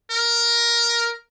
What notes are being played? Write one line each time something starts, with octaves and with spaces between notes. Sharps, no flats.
A#4